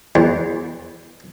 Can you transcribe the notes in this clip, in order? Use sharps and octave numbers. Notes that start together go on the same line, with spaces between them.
E2